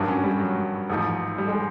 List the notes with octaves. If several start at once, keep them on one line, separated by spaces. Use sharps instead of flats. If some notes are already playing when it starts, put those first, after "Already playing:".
Already playing: G#1 G2 D#3 F#3 D4
C#4
G3
F#3
A1 G#2 F3
G3
G#3